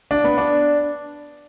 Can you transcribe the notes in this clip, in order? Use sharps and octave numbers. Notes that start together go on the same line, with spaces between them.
D4
B3
D4